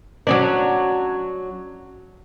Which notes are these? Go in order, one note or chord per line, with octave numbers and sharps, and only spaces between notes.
F#3 C#4 D4